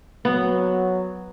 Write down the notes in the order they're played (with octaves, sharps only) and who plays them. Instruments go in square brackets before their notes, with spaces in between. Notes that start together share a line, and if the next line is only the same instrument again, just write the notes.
[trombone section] F#3 [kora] B3